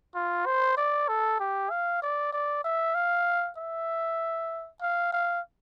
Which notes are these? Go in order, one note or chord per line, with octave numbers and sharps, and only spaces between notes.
F4
C5
D5
A4
G4
F5
D5
D5
E5
F5
E5
F5
F5